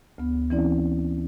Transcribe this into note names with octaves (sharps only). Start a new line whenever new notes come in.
D2 B3
E3 C4 C#4 E4 D5